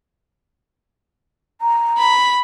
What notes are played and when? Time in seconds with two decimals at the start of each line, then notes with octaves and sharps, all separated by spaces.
1.61 A#5
1.98 B5